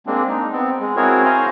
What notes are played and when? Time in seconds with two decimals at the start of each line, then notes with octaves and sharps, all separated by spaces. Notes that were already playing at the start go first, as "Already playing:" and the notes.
0.07 G#3 A#3 C4 D4
0.29 D#4
0.52 B3 C4
0.80 G#3
0.96 C4 E4 F#4 G#4 A#4 C#5
1.25 C5 F5 G#5 A#5 C6